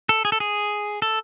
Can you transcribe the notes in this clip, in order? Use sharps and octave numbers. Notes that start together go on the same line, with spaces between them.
A4
G#4
A4
G#4
A4